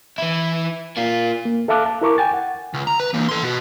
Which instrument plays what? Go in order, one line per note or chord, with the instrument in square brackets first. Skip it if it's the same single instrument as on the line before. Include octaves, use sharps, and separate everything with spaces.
[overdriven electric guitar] E3 E4
A#3 F4
[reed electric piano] A#3
A4 E5 F5 A5 D6 F#6
A5
E4 A#4 C#6 D6
G5 G#5 A6
F#5
[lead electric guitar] C#2
A#5
B4
E3 A#3
A4 C6
B2 F#4